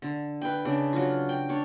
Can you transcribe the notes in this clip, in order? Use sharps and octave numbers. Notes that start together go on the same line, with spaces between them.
D3
B4 G5
C#3 D4
F#3 F4
G5
D4 C#5